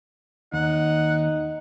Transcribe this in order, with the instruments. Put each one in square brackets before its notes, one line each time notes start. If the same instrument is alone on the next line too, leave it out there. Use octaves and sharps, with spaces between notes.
[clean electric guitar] D#2 [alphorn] D#4 [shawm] F#5